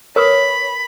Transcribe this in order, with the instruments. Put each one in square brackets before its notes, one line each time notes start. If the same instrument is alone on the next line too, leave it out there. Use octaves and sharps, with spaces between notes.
[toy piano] A#4 B4 D#6 [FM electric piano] C#5 [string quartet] B5